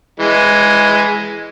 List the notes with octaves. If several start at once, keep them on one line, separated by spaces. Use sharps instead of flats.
E3 G#3